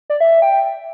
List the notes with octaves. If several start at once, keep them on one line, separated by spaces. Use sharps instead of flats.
D5
E5
E5
G5